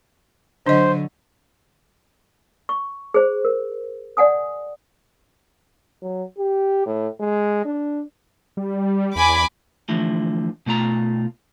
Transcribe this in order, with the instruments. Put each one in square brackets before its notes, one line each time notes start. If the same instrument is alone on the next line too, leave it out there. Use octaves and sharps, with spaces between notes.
[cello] D3 F#3 [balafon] D4 D#5 [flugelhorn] C5
[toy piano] C#6
G#4 C5
A#4
D5 F#5 G#5 D#6
[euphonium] F#3
G4
A2
G#3
D4
[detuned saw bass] G3
[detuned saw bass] E2 [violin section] G#5 B5 D6
[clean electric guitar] D3 E3 F3 A3
B2 A3 F4 A#5